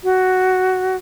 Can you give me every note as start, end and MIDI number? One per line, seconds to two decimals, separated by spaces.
0.04 0.96 66